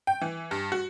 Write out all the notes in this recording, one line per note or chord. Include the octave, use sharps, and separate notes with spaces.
G5
E3
G2
F#4